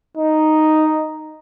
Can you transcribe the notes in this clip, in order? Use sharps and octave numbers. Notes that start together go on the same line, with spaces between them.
D#4